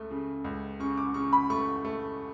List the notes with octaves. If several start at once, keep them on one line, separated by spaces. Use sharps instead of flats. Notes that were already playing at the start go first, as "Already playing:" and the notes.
Already playing: C#2 A3
C#3
C#2
C#3 C#6
D6
C#3 C#6
B5
A3 C#6
A3